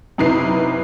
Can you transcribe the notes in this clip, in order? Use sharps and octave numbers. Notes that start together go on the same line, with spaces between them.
F#2 C3 D#4 E4 B4 C7